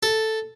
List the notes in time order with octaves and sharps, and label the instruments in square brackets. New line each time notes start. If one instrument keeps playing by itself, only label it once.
[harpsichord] A4